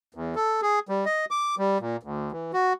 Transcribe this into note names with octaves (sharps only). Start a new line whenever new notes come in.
E2
A4
G#4
G3
D#5
D6
G3
A#2
D2
E3
F#4